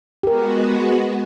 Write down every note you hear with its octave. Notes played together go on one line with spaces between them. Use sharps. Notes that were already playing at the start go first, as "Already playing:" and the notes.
G#3 B3 F#4 G4 A#4